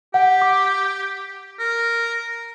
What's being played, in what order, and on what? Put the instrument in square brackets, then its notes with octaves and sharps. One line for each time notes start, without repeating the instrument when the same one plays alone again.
[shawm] G4 [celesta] F#5
[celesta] D6
[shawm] A#4